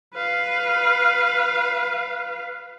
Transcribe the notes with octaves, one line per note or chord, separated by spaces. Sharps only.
B4 F5